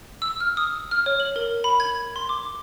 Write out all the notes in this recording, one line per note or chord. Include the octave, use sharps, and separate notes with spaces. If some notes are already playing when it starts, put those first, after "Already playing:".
E6
F6
D#6
F6
C#5
F#7
A#4
B5
G#6
C6
D6